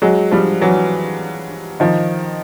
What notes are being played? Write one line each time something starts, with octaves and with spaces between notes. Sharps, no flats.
F#3 G#3
F3 G3
E3 F#3
D#3 F3